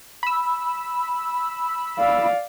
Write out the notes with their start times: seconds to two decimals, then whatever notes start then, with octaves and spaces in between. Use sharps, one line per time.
0.23 B5 E6
1.99 D5 F5